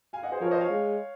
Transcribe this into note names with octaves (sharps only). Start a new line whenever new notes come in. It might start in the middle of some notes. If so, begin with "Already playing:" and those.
F5 G#5
D#5 F#5
G#4 C5
F3 A#4 C#5
C5 D#5
C#5 F5
G#3